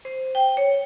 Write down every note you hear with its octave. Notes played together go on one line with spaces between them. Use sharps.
C5
G5
C#5